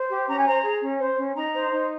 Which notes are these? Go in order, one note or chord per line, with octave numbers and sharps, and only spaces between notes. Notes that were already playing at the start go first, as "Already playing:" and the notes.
Already playing: C5
G4
C#4 A#5
G#5
C5 A#5
G#4
C#4
C5
C#4
D#4 A#5
C5
D#4